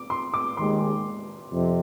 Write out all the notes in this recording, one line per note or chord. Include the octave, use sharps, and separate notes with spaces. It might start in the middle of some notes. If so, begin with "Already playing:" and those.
Already playing: D6
C6
D6
D#2 D#3 G#3 C6
F2 C3